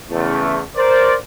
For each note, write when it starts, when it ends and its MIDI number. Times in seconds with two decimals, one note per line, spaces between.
0.11 0.61 40
0.11 0.61 49
0.11 0.61 57
0.76 1.15 70
0.76 1.15 72
0.76 1.15 74